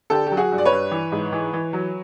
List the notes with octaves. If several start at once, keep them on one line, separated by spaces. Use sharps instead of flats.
D3 G4 A4
F#3 G4
F#4 G#4
G2
D5
B4 C#5
G2
E3
G#2
E3
E3
F#3